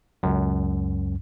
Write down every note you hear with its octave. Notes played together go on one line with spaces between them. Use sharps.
C#2 F#2